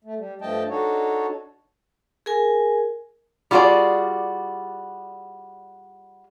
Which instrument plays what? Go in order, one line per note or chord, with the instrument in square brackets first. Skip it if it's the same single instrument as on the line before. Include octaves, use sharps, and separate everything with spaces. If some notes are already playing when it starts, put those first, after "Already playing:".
[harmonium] A3
G3
G2 F3 A3 D#5 G5 A5
D4 D#4 F#4 A4 C#5
[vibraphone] G#4 A#4 G#5
[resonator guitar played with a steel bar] G3 F4 F#4 G#4 D5